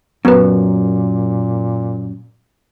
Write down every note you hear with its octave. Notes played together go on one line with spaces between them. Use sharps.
F#2 A#2 B3 B4